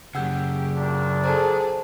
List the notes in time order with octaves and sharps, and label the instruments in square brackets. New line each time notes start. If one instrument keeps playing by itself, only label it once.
[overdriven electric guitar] F#2 C#3 [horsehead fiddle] G4 [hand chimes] F#5 E6 G6
[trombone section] D2 A#2 D4
[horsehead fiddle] G#4 A4 [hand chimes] C5 A5 A#5